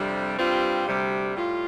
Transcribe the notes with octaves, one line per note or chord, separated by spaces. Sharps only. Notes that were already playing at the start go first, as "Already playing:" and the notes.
Already playing: F2 C3 G3 D4
G2 G3 C4 F4
D2 C3 G3
A2 G3 F4